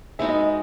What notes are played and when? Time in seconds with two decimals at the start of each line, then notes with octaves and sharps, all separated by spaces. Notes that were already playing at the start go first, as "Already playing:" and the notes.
0.19 G#3 B3 D#4 F#4 E5
0.29 D#5
0.39 D#5